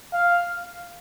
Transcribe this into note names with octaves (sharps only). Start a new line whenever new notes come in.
F5